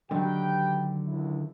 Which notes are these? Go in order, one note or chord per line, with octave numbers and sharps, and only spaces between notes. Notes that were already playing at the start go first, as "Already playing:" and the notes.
D3 D#3 F#3 G4 B4 G5
C#2 F#2 E4